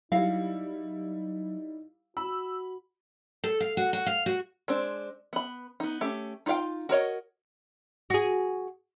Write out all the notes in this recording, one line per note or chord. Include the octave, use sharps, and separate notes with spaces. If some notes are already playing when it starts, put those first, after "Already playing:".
F#3 G3 D#4 E4 F5
F#4 B5 E6
A4
F5
F#4
F#4
F5
F#4
G#3 C4 D4
B3 B5
B3 D#4
A3 C#4 G4
D#4 F4 G#4 F5 G5
F#4 A#4 C#5 D#5
F#4 G#4